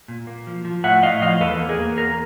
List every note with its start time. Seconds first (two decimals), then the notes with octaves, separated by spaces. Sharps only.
0.08 A#2
0.27 A#3
0.47 F3
0.65 F3
0.84 A2 E5 F#5
1.03 A2 D#5 F5
1.22 F3 D#5 F5
1.41 E2 A4 B4
1.59 A#3
1.69 G#4 A#4
1.79 A#3
1.97 E2 G#4 A#4